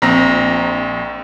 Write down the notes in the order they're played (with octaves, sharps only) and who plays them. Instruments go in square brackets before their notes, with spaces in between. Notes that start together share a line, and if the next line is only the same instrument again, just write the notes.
[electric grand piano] A#1 C4 A#5 A#6